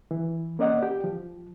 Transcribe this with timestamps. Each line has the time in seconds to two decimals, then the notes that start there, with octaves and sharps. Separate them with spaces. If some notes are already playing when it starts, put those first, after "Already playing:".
0.11 E3
0.59 A#3 C#4 D5 D#5 F#5
0.82 G4 G5
1.04 F3